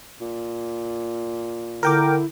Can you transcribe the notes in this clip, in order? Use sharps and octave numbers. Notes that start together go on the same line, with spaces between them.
A#2
D3 E4 A#4 G5 D6